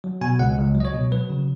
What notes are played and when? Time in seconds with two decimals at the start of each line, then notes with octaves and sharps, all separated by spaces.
0.04 F#3
0.21 B2 G#5
0.39 C#2 F#5
0.58 C#2
0.75 F#3
0.80 D#5
0.85 C#5
0.94 B2
1.12 F#3 B4
1.30 C#3